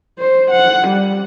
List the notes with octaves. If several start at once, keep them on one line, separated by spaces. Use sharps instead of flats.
C5
F#5
G3